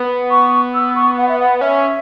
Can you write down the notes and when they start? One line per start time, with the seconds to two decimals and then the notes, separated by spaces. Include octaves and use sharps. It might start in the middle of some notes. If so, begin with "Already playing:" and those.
Already playing: B3
0.30 C#6
0.74 E6
0.95 C#6
1.18 F#5
1.28 E5
1.39 F#5
1.61 C#4 E5